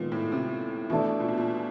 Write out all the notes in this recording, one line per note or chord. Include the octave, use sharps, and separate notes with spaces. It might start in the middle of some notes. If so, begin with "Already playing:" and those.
Already playing: A#2 D#3 G#3 B3
A2
C3
B2 E3 A3 D4
A#2
B2
A#2